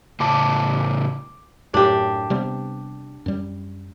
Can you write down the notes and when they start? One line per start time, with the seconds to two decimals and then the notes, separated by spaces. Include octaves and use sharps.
0.20 A2 C#3 A5 D6
1.74 F#2 A2 D4 G4
2.30 C3 G3 B3
3.26 F#2 G3